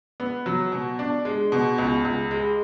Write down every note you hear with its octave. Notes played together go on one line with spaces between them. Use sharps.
B3
F#3
B2
D4
G#3
B2
C#2
C#2
G#3